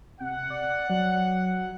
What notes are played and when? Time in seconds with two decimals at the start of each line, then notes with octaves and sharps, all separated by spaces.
0.20 C3 F#5
0.50 D5
0.90 F#3